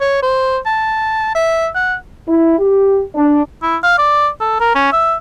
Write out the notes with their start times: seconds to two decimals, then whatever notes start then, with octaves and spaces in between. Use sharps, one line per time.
0.01 C#5
0.22 C5
0.66 A5
1.35 E5
1.75 F#5
2.28 E4
2.59 G4
3.15 D4
3.63 E4
3.83 F5
3.98 D5
4.41 A4
4.60 A#4
4.75 C#4
4.93 E5